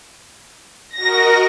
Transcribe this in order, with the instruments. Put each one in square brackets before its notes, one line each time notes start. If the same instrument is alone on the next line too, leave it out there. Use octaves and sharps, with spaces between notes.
[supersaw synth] F#4 A#4 D#5 [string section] A#6